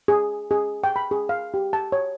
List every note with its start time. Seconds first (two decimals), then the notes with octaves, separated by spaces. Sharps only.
0.08 G#4
0.51 G#4
0.84 G5
0.96 B5
1.11 G#4
1.29 F5
1.54 G4
1.73 A5
1.92 C#5